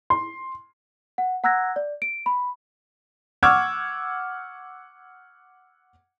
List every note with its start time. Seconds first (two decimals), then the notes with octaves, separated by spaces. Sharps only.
0.10 C6
1.18 F#5
1.44 F#5 A#5 E6 F#6 G#6 A#6
1.76 D5
2.02 D7
2.26 B5
3.43 F#5 C#6 D6 E6 F6 G#6